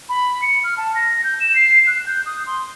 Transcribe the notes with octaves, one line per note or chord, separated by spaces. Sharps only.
B5
C#7
F6
A5
A#6
G6
E7
C7
F#6
G6
D#6
C6